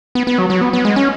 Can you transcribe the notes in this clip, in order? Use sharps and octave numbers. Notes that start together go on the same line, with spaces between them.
B3
B3
F#3
F#3
B3
B3
G#3
C#4